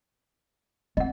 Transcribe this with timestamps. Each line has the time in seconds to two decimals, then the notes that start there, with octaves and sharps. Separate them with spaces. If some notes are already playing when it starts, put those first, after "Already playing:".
0.97 C4 D#5 F#5